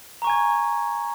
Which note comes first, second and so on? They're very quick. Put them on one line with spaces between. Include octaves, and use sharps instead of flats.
A#5 C#6 G#5 G#6